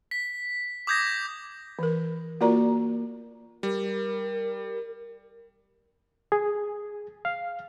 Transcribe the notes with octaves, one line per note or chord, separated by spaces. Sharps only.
B6
D6 D#6 G6 G#6 A#6
E3 A#4
A#3 F4 F#4 A#4 D5 A#5
G3 A#4
G#4
F5